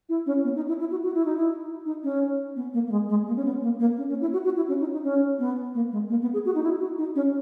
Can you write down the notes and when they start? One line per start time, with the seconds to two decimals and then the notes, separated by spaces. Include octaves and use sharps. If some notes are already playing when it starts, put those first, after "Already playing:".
0.09 E4
0.26 C#4
0.44 B3
0.56 D#4
0.68 E4
0.79 E4
0.91 F#4
1.03 F#4
1.14 E4
1.25 D#4
1.37 E4
1.85 D#4
2.03 C#4
2.56 B3
2.73 A#3
2.87 A#3
2.91 G#3
3.09 G#3
3.27 A#3
3.36 C#4
3.45 B3
3.62 A#3
3.80 A#3
3.97 C#4
4.09 C#4
4.21 E4
4.33 F#4
4.45 F#4
4.56 E4
4.68 C#4
4.80 D#4
4.92 D#4
5.04 C#4
5.39 B3
5.74 A#3
5.92 G#3
6.10 A#3
6.22 B3
6.33 G#4
6.45 F#4
6.55 D#4
6.63 E4
6.80 F#4
6.98 D#4
7.15 C#4